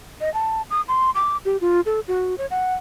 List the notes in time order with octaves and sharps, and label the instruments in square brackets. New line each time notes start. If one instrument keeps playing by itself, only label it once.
[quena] D#5
A5
D#6
C6
D6
G4
F4
A4
F#4
C#5
F#5